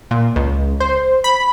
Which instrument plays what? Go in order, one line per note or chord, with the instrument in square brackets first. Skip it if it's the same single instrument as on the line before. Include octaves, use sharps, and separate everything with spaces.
[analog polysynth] A#2
C#2
C5
B5